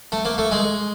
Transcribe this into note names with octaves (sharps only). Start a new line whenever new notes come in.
A3
A#3
A3
G#3